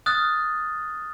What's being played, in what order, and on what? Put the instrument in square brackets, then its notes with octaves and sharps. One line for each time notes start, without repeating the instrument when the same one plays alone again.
[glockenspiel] D#6 F6 F#6 A6